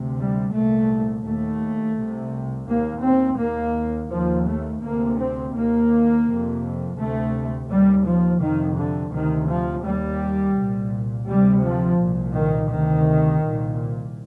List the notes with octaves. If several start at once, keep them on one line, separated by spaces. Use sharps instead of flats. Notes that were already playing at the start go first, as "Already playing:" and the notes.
Already playing: D2 C3
G3
C2 A#2 A3
D#2 A3
C2 C3
D#2 A#3
C4
D#2 A#3
D#2 F3
A3
D2 C3 A#3
C4
D#2 A#3
F2 C3
D2 C3 A3
D#2 G3
F3
F2 C3 D#3
D3
D2 C3 D#3
F3
D#2 G3
C2 A#2
D2 C3 G3
F3
C2 A#2
D#3
D2 C3 D#3
C2 A#2